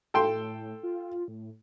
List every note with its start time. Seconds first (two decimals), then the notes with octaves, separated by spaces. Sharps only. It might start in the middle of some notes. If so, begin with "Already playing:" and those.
0.14 A2 A4 G5 C6
0.83 F4
1.28 A2